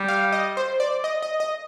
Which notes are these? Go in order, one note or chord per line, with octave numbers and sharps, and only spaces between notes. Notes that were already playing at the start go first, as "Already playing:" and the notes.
Already playing: G3
F5
D#5
C5
D5
D#5
D#5
D#5